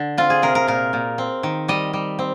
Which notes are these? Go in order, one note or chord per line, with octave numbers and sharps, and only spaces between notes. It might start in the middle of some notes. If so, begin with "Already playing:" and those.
Already playing: D3
C4 F4
G#4
C3 A#4
A#4
A#2 A#4
A#2
C4
D#3
G3 D#5
G3
C4